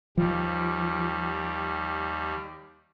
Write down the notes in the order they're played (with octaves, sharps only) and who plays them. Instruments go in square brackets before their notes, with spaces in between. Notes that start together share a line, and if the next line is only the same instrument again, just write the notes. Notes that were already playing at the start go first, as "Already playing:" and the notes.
[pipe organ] D#2 G3 [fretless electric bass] F3